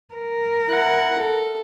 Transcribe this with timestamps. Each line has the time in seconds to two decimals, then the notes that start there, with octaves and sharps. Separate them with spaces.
0.15 A#4
0.68 E4 F#5
1.19 A4